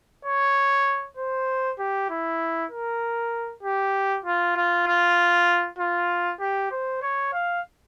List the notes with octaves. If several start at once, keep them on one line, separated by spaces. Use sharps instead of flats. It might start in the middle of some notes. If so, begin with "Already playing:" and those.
C#5
C5
G4
E4
A#4
G4
F4
F4
F4
F4
G4
C5
C#5
F5